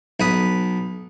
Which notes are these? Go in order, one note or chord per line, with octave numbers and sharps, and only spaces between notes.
B1 B4 D#6